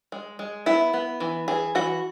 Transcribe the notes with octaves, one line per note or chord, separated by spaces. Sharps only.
G#3
G#3
B3 E4
B3
E3
E3 G#4
E3 F#4